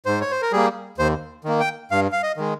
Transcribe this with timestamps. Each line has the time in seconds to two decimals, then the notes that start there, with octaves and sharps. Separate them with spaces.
0.06 G#2 C5
0.21 C#5
0.31 C5
0.42 A#4
0.52 G3 A#3 G#4
0.98 D#2 C5
1.44 D#3 A#3
1.60 G5
1.91 G2 F5
2.12 F5
2.23 D#5
2.37 D#3 G#3